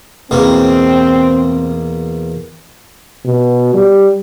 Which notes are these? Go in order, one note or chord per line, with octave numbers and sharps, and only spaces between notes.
E2 B2 A#3 C4
B2
G3